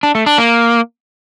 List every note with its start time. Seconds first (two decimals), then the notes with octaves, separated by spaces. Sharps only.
0.03 D4
0.15 A3
0.26 D4
0.38 A#3